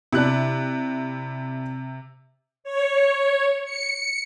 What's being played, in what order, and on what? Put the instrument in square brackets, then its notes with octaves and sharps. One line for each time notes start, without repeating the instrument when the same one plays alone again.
[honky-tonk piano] C3 F#6 [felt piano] D4 E4
[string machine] C#5
C#7